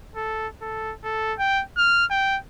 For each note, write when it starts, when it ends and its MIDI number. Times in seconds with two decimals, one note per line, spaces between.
0.16 0.48 69
0.62 0.93 69
1.04 1.34 69
1.39 1.63 79
1.77 2.05 89
2.10 2.38 79